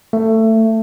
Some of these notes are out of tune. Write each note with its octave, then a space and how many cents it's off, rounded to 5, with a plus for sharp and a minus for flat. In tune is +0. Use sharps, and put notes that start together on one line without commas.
A3 +20